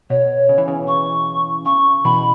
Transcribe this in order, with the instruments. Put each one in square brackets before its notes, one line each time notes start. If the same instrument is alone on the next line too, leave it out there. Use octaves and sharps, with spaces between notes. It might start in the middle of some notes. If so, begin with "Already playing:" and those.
[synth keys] B2 [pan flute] C#5
[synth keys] C#3
E3
C#3
[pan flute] C#6
[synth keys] C#3 [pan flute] C#6
[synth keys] B2 E3 [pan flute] B5